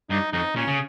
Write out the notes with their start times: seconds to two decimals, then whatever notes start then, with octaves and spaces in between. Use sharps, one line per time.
0.10 G2 D#4
0.32 F2 D#4
0.56 A#2 C#4
0.67 C#3